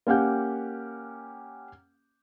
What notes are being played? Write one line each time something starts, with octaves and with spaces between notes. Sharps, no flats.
A#3 C#4 G4 F#5 G6